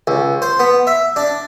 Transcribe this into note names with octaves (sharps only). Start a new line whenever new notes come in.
C#2
C5
B3
E5
D4